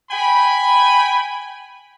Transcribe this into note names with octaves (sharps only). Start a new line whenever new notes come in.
G5 G#5 B5